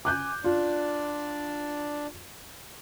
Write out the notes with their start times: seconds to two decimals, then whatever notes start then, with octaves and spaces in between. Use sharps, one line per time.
0.05 G#5 D6 F#6 G6
0.44 D4 F4 D5